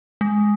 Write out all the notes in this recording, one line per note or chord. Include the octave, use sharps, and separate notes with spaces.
G#3